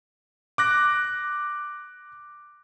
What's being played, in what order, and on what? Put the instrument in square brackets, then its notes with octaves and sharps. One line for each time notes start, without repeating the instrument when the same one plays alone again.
[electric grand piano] D6 F#6 A#6